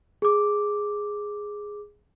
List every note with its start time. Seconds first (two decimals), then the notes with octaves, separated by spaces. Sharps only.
0.22 G#4 D6